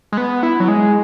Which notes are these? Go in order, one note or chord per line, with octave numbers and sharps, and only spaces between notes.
G#3
B3
E4
F#3
G#3